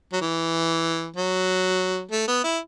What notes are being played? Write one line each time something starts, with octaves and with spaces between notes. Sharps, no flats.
F#3
E3
F#3
A3
B3
E4